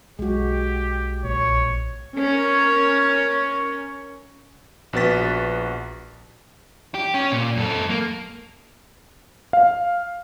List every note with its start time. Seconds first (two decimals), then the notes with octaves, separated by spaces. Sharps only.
0.19 B1 G#3 F#4 G4
1.24 A#1 C#5
2.17 C#4 A#4 C#5
4.93 A#1 B3 F#4 B4 A6 B6
6.95 G4
7.14 C#4
7.32 A#2
7.57 F#2 A4
7.90 A#3
9.53 F5